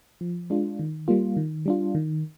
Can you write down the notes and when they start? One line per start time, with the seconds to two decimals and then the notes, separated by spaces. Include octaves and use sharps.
0.21 F3
0.50 G#3 D4 F4
0.79 D#3
1.08 G3 A#3 F4
1.37 D#3
1.66 G3 D4 F4
1.95 D#3